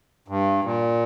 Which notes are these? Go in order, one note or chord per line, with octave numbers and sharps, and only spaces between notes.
G2
A#2